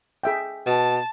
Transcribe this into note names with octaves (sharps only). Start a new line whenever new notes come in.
G#4 E5 G5
B2 A5